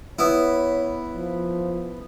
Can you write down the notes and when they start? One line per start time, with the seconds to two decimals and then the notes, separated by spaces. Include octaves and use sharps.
0.19 B3 E4 C#5
1.15 F3